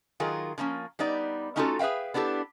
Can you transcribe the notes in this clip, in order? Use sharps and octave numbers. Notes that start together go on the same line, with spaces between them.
D#3 F#3 F4 G#4 A#4
D3 F3 A#3 C#4
G3 B3 D#4 D5
A3 C#4 D#4 F4 F#4 A4
G#4 B4 E5 F5 G5
B3 D4 E4 G4 A4